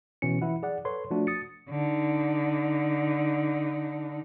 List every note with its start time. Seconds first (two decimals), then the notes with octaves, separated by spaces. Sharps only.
0.22 B2 E3 C#4 C#7
0.42 E3 E4 F#5
0.63 G#4 D5 F#5
0.85 A4 B4 C#5 C6
1.11 F3 A3 D4 F#4
1.27 D#6 A6 C#7
1.69 D3 D#4